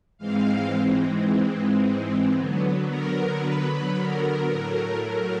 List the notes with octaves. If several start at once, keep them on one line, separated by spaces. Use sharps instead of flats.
G#2 E3 G#3 C4 F5
D3 F#3 B3
A#4
B4
A#4
A2 F#3 A3
A#4